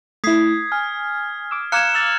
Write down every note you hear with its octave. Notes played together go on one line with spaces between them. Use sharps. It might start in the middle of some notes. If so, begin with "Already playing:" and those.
A3 E4 D#6 G#6 B6 C7
G#5 F6
D6 E6
F5 A#5 D6 F6 F#6 G#6 C#7 E7
E6 F#6 A6 F7